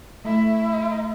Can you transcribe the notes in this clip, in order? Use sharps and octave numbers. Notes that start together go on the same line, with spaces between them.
A3 E4